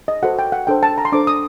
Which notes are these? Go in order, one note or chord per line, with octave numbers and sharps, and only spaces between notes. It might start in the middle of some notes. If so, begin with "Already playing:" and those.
D#5
F#4 A4 C5 F#5
G5
F#5
D4 A4 C5 G5
A5
A#5
C6
D4 A4 C5 D6
D#6